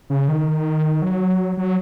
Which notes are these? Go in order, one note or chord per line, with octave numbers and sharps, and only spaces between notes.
C#3
D#3
F#3
F#3